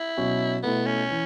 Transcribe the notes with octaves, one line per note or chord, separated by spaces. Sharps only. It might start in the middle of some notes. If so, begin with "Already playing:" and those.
Already playing: E4
B2 F#3 C#4 F#4
B2 A3 B3 E4
C#4
E3